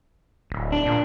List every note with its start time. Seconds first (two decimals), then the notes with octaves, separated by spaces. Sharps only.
0.50 D1
0.72 D4
0.86 A#2